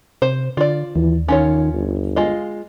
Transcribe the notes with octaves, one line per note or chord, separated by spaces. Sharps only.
C3 C5
D3 F4 D5
D#2 E3
D#3 C#4 F4 C#5
G1
G#3 F4 D#5